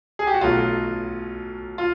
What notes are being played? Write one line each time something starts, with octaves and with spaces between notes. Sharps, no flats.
G#4
G4
F#4
B1 B2 F#3 A3 F4
F4